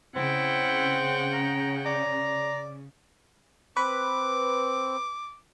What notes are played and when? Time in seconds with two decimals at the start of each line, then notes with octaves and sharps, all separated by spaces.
0.15 C#3 C4 E4 F#5 G5
1.33 A#5
1.86 D5 A#5
3.77 C4 B4 D6